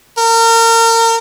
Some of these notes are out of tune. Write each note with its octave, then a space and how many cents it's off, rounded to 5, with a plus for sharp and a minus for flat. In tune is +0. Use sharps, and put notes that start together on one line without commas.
A#4 -30